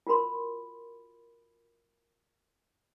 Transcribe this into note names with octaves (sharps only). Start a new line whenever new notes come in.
F4 F#4 A#4 B5 C6